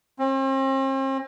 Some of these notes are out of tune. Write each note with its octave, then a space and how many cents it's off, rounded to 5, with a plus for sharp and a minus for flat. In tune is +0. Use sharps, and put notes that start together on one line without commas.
C4 +45